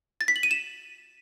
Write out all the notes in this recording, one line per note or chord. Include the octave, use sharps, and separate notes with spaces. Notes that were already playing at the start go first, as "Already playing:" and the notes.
A6
B6
F#7
D#7
E7